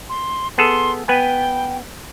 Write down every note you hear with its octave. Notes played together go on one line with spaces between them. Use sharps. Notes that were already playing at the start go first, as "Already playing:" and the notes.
C6
B3 G#4 A4 C6
B3 B4 G5 G#5